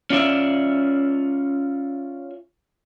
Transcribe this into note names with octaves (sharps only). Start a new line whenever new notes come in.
C#4 F4 D5 E5